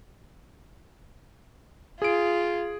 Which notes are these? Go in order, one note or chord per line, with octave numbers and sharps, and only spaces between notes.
F4 G#4 D7